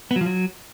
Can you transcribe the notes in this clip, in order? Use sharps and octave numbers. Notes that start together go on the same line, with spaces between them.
B3
F#3
F3
F#3